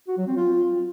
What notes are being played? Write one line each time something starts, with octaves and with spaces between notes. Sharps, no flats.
F#4
F#3
C4
F4